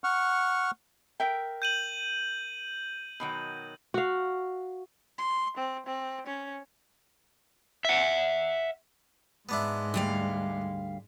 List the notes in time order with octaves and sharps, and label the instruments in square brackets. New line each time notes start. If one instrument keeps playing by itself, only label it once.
[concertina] F#5 C#6 F6
[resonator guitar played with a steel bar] A#4 E5 G5
[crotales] G6 D#7 F#7
[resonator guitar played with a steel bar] B2 D#3 F#3
[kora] F#4 F5
[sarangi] C6
C4
C4
C#4
[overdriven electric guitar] E5 F#5
[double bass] G#2 G#3 [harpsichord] B3 D4 E4
[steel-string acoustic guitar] D2 G3 F5